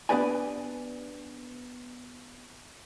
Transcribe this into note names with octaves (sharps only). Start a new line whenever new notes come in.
B3 D4 G4 B4 D5 G#5